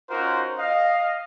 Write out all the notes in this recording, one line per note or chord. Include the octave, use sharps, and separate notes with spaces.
C#4 D#4 F4 F#4 A#4 C5
D#5 F5